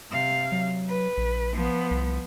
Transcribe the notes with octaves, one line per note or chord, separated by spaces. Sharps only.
C3 F5
F#3
B4
A#1
F3 B3
C2